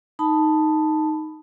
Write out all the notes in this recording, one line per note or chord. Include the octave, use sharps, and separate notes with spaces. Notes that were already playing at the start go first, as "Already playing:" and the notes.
D#4 A5 B5